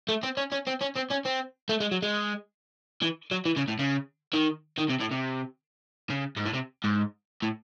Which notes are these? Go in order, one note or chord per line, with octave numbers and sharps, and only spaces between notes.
A3
C4
C#4
C#4
C4
C#4
C4
C#4
C4
A3
G#3
F#3
G#3
E3
F#3
E3
C#3
A2
C#3
D#3
D#3
C3
A2
C3
C#3
G#2
A2
C3
G#2
A2